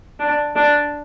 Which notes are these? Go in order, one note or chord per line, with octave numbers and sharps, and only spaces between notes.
D4
D4